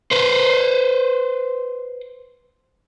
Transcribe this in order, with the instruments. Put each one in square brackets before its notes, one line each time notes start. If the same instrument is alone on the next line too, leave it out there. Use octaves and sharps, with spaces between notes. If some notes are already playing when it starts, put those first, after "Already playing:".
[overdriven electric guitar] B4 C5